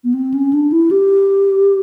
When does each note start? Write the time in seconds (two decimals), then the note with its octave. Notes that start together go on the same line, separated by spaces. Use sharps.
0.04 B3
0.14 C4
0.34 C#4
0.53 D4
0.72 E4
0.91 G4